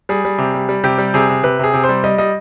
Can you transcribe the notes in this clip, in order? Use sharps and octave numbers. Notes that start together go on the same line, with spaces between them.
G3 G#4
G3
C3
G3
G3
C3 G4
G3
C3 G#4
C3
C3 B4
C3 G#4
C3
C5
G3
G3 D#5
G3 D#5